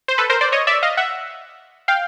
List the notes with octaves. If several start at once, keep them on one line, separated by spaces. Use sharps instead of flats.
C5
A4 B4
A#4 C5
C5 D5
C#5 D#5
D5 E5
D#5 F5
E5 F#5
F5 G5